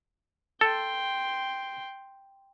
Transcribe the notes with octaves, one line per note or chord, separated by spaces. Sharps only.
A4 G5 C6